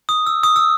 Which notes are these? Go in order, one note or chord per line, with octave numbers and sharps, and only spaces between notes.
D#6
E6
D#6
E6